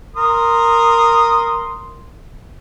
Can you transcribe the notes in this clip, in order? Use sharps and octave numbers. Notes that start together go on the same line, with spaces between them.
A#4 C6 D#6